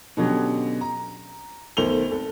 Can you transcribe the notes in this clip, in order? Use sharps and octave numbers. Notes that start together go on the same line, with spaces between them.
B2 D3 F#3 C#4 G4
A#5
B1 D#3 A3 C5 F7 G7
G#1 A4